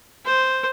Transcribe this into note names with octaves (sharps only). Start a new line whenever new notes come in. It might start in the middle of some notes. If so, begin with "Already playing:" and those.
C5